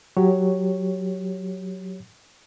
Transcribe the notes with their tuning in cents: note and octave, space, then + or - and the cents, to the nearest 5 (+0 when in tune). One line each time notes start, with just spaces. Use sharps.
F#3 +0 G4 +0 C#5 +0